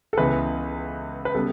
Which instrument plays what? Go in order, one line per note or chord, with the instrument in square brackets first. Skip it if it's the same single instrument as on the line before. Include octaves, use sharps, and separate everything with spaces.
[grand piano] A4
C#2 C#3 E3 B3 B4
B4
C#3 G3 B3 A4